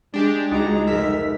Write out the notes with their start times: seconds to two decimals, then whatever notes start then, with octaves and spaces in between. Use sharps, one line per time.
0.14 G#3 D4 G4
0.51 C#2 D#4 F#4 A5 A#5
0.87 F1 A#4 E6 B6